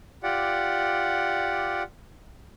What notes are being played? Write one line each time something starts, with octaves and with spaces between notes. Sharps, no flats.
F4 G4 D5 F#5